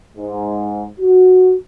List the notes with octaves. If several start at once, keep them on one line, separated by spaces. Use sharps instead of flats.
G#2
F#4